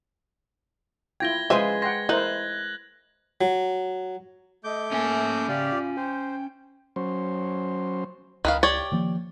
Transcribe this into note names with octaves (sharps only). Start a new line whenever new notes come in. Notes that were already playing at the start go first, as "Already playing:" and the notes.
E4 F4 G5 G#6 A#6 G7
C#3 F3 G#3 B4 C5 E5 G#5
F#5 G5 C6 G#6 A#6
D#4 E4 A#4 C5 F#6 F#7
F#3
A3 D#5 D6 G6
A#3 C#4 E5 G#5
C#3 G4 D5 F5
F4
C5 G5
F#3 C#4 C5
C#2 D#3 B4 F5
G4 C#5 D5
D#3 F3 A#3